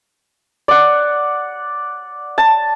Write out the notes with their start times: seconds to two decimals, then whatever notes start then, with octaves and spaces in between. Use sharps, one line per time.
0.68 D5 F#5
2.38 A5